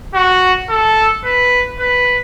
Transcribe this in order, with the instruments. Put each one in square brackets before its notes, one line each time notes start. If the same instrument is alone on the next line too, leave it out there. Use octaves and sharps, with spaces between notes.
[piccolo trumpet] F#4
A4
B4
B4